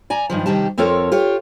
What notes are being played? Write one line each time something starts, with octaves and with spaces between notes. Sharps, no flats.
D5 G#5 A#5
G2 D#3 F3
C3 D#3 G3 G4 A5
F2 C4 F4 A4 A#4 C#5
F4 G4 C#5